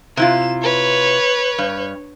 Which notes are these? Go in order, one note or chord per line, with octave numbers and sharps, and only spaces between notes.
C3 E4 F4 E7
B4 C#5
G2